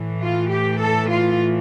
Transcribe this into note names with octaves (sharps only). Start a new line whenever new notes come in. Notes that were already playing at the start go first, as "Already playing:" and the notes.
Already playing: A2 E3
F4
G4
A4
F4